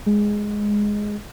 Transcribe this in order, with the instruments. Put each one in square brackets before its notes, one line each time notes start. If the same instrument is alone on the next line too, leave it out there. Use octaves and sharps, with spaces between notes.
[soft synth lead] G#3